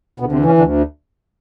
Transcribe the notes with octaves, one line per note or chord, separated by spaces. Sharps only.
D2 B2 B3
C3 C4
E3
C#3 C#4
D2 D3 D4